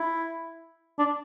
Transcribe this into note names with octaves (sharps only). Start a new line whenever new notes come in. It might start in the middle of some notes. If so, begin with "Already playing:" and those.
Already playing: E4
D4